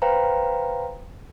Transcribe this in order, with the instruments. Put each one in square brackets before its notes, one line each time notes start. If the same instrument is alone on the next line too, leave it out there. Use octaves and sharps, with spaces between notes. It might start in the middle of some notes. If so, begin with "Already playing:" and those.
[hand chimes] B4 C5 F5 G5 A#5